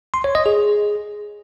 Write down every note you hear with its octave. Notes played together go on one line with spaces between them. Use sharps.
C6
C#5
D#5
G#4